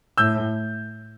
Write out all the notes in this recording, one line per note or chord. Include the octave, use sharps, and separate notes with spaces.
A2 E6 G6